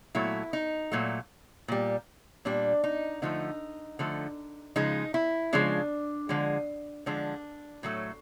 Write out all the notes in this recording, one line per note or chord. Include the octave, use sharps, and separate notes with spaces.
A#2 F#3 A3 E4
D#4
A#2 F#3 A3
A#2 G3
A#2 G3 D4
D#4
D3 F3 A3 D#4
D3 F3 A3
C#3 F3 G#3 D#4
E4
C#3 F3 G#3 D4
D3 F3 G#3
D3 F3 G#3 D4
A2 F#3 A3